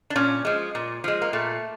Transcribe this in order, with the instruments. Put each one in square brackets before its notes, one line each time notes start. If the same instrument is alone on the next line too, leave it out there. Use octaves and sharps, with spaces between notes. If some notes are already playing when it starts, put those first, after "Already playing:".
[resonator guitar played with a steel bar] D4
A#2 C#4
F3 G#3
A#2
F3 G#3
A#3
A#2 A3